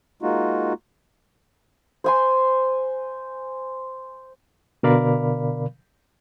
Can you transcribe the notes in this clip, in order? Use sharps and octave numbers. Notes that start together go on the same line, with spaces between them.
G#3 A#3 D#4 F4 F#4
C5 G#5 C6
B2 D3 A#4 D5 F5 B5